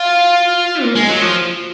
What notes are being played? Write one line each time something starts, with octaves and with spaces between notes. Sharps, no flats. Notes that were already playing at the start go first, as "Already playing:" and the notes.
Already playing: F4
A#3
G#3
F#3
F3